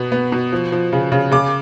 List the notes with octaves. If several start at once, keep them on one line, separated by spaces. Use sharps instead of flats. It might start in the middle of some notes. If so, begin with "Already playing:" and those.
Already playing: B2 B3
B3
B2
F3
F3
C#3
C#3
C#3 D6